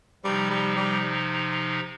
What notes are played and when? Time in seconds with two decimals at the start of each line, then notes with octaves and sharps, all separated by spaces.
0.24 C3 F3 G3 D#4
0.50 G3
0.76 G3